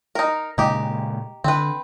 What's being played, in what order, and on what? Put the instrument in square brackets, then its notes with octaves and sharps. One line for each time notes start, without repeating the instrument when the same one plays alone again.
[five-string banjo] D#4 A#4
[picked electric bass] A#2 C#3 G#3 [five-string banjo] D#4 G4
[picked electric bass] D3 [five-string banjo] C4 B4